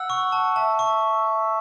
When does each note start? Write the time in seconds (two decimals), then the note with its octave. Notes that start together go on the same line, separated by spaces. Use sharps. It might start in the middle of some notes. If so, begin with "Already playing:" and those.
Already playing: F#5 E6
0.10 C#6
0.32 A5
0.56 E5 A5
0.79 C#6